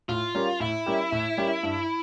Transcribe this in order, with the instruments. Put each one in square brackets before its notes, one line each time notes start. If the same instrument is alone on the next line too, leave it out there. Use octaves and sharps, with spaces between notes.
[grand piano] A2 [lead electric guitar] F4
[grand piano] G3 C#4 G4 A#4
[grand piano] A2 [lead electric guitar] E4
[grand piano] G3 C#4 G4 A#4
A2
G3 C#4 G4 A#4
G2